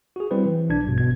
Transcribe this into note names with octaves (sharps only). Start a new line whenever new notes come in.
F#4 G#4
G3 C4 E4 B4 C5
E3
B1 D4 G#6
A#1 G2 B2
G1 B2 G#6